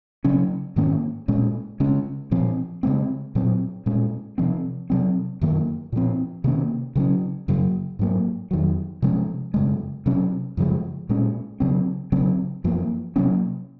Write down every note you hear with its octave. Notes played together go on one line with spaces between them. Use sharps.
C#3 F#3 C#4
G#2 D#3 A#3 C#4
A#2 G#3 C#4
C#3 G#3 C#4
A#2 F3 C4
C#3 G#3 C4
A#2 F#3 C4
A#2 G#3 C#4
C3 F3 C4
C3 F#3 C4
F#2 D#3 A#3
A#2 F3 C4
C3 D#3 A#3 C#4
C#3 F#3 C#4
F#2 C#3 F#3
G#2 F#3 A#3
F2 D#3 F#3
C3 F3 G#3 C#4
F#2 C#3 G#3
C3 F#3 C#4
F#2 C#3 F3 G#3
A#2 G#3 C#4
C#3 F#3 C4
C#3 F#3 C4
F#2 F3 A#3
C3 F#3 A#3 C#4